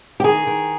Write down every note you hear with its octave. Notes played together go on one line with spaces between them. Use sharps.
G4
D#3 G#4
D#3